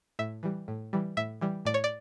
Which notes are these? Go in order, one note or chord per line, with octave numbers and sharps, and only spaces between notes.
A2 E5
E3 G3
A2
E3 G3
A2 E5
E3 G3
A2 D5
C#5
D5